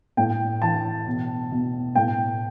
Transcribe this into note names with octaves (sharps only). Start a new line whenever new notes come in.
A2 G5
E3 A5
B2
B2
A2 G5